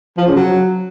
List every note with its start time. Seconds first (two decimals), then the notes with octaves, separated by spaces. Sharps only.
0.17 F3
0.27 C#3
0.36 F#3